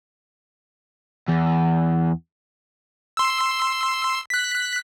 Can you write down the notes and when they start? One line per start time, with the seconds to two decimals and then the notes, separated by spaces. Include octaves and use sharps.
1.28 E2
3.17 C6 E6
4.30 F#6 B6